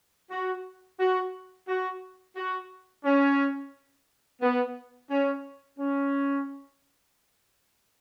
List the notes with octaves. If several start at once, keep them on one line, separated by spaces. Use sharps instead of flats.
F#4
F#4
F#4
F#4
C#4
B3
C#4
C#4